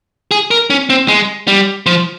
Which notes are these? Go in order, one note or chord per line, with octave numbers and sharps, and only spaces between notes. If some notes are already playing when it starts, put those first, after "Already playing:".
G#4
A#4
C#4
C4
G#3
G3
F3